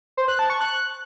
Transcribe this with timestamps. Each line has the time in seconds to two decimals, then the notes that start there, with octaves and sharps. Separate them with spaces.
0.17 C5
0.28 F#6
0.39 A5
0.50 C#6
0.60 F#6